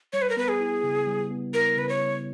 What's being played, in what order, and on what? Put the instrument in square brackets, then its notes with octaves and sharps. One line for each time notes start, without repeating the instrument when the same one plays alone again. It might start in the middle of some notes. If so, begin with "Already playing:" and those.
[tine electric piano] G3 [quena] C#5
[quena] B4
A#4
[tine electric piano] B3 [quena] B4
[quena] G#4
[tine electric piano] E4
C#3
G3
B3
[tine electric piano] E4 [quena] A#4
[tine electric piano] C#3 [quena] B4
[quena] C#5
[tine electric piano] G3